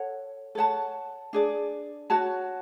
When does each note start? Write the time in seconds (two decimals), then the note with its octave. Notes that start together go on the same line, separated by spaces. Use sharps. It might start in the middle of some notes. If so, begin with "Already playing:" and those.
Already playing: A4 C#5 F#5
0.55 A4 C#5 F#5 A5
1.33 D4 G#4 D5
2.10 F#4 C#5 F#5 A5